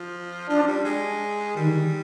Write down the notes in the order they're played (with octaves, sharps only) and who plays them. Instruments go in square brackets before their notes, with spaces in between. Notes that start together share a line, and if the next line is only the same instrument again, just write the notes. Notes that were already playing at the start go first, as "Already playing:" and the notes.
Already playing: [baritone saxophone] F3
[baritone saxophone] F3 [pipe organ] D4
[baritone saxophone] G3
G#3
[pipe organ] D#3 [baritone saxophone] G3